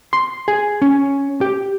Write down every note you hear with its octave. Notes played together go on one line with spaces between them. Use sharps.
C6
G#4
C#4
G4